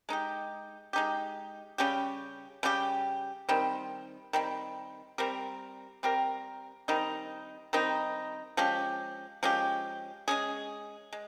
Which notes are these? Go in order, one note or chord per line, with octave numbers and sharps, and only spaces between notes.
G#3 D#4 G4
G#3 D#4 G4
C#3 G3 C#4 G4
C#3 G3 C#4 G4
D#3 G3 C4
D#3 G3 C4
G3 C4 G4 A#4
G3 C4 G4 A#4
D#3 G3 C4 D#4
D#3 G3 C4 D#4
F3 G#3 C#4 G4
F3 G#3 C#4 G4
G#3 C#4 G#4
G#3